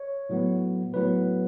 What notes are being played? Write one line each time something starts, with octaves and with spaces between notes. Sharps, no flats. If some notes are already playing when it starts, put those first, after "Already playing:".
Already playing: C#5
A2 F#3 B3
A2 F#3 B3 B4